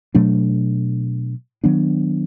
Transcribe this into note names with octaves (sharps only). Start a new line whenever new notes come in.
B2 F#3 A3 D4
D#3 F#3 B3 D4